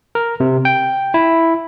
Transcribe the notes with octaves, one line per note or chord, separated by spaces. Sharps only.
A#4
C3
G5
E4